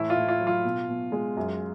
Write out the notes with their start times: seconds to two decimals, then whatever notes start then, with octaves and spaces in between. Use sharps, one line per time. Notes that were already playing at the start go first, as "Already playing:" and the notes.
Already playing: A2 E3 E4
0.10 F4
0.16 A2
0.28 F4
0.40 F#3
0.47 F4
0.64 B2
0.89 B2
1.12 G#3
1.37 F#2